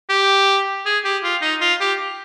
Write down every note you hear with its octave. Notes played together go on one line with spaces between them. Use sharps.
G4
G#4
G4
F4
D#4
F4
G4